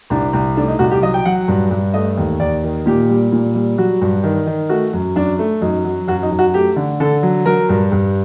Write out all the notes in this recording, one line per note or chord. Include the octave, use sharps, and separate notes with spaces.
C2 D4
C2
A3 D4
D#4
C2 F#4
G4
F#3 D#5
G5
F#3 F#5
G2
G2
A3 D#5
D#2
D#2 D5
D#3
A#2 G4
G3
A#2
G3
F#3 F#4
G2
D#3
D#3
A3 F#4
F#2
F#2 D4
A3
F#2 D#4
F#3
F#2 F#4
D#4
F#2
F#4
A3 G4
D3
D3 A4
F#3
F#3 A#4
G2
G2